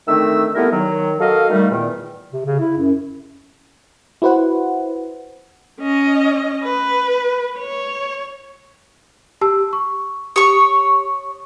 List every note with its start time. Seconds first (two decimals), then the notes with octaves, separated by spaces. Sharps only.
0.08 D3 D#3 A3 C4 E5 E6
0.55 G3 A3 B3 E4 A#4
0.72 D#3 F#3
1.20 F#4 A4 A#4 D#5 F5
1.50 D#3 G3 A3
1.70 E2 A#2 D#3
2.33 C3
2.46 C#3
2.60 E4
2.77 F#2
4.22 E4 F#4 B4 C5 F#5
5.81 C#4 D#5
6.64 B4
7.58 C#5
9.41 G4 A5 E6
9.73 C#6
10.36 G4 C#5 C#6 D#6